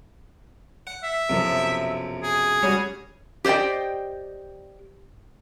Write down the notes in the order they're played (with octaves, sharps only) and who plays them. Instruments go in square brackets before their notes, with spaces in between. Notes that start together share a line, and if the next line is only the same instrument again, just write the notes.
[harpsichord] F#5
[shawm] E5
[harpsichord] B1 F#2 [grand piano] C3 F3
[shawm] G#4
[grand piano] G3 F#4 [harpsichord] C#4
[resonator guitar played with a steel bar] G4 C5 D5 D#5 G5